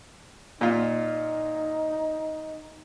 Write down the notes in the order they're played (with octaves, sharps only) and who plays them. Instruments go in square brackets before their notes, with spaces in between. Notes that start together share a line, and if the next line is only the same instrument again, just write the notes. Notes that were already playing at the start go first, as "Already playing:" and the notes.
[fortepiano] A#2 F4 [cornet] D#4